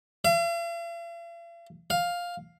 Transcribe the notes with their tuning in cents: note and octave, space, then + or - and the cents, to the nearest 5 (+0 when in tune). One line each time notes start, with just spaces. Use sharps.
F5 -45
F5 +10